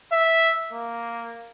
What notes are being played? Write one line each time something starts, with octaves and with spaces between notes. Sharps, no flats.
E5
A#3